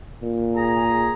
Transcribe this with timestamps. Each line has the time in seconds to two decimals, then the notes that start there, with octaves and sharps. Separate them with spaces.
0.22 A#2
0.56 G#4 A#5